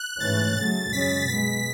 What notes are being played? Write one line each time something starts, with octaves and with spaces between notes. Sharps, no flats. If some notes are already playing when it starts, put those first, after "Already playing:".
Already playing: F#6
G#2 E3 A3 C#4 A6
C#3 F#3 A3 A6
F#2 C#3 G#3 C#4 B6
B2 G#3 B3 B6